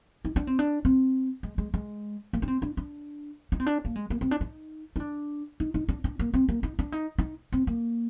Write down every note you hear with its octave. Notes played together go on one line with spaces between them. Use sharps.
D#4
D4
C4
D4
C4
G#3
G#3
G#3
A#3
D4
C4
D4
D4
D#4
C4
D4
A#3
G#3
A#3
C4
D4
D#4
D#4
D4
D#4
D#4
D4
D4
A#3
C4
A#3
D#4
D4
D#4
D#4
C4
A#3